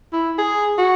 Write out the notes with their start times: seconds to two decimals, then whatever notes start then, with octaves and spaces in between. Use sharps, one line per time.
0.13 E4
0.38 G#4
0.78 F#4